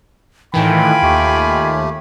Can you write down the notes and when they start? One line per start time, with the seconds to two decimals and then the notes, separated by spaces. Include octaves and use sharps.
0.54 A2 D#3 E3 F4 G5 G#5 B5
1.02 D#2 A3 G4